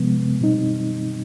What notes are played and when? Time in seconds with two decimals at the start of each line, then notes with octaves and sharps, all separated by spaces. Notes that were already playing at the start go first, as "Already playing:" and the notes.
Already playing: C3 F3 G#3 B3
0.40 B2 G3 C4 D#4